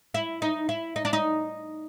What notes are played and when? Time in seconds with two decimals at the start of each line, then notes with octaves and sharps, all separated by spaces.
0.14 E4
0.42 D#4
0.69 E4
0.96 D#4
1.05 D4
1.13 D#4